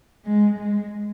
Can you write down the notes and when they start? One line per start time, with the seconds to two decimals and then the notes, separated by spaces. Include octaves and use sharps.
0.25 G#3
0.58 G#3